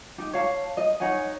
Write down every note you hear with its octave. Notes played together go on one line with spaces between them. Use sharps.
D#4 G4
C#5 F5 A5
D#5
D#4 C#5 F#5 G#5